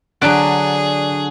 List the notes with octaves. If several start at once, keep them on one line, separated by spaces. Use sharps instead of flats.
D3 F#3 D4 G#4 F#6 D7